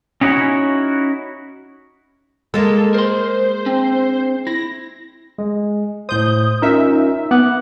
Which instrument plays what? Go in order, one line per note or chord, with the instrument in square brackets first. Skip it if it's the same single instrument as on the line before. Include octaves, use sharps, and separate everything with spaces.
[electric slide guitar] C#4 D#4 E4 F#4 C#5
[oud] G#3 A#3 [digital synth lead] A4
[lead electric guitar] A#4 C6 [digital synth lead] C5
[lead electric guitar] C4 D4
[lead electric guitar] E4 [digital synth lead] A#6
[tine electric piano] G#3
[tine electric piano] A2 C5 [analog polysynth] D#6 G6
[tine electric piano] C#4 F4 A#4 [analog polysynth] D#4 E5
[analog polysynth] B3 [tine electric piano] F#5 D6 F#6